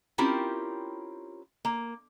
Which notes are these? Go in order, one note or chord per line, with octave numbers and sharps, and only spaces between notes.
C4 C#4 E4 F4 G4 A#4
A#3